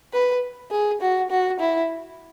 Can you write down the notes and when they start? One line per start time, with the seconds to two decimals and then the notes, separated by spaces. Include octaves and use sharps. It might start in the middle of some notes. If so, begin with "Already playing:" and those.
0.13 B4
0.71 G#4
1.01 F#4
1.30 F#4
1.59 E4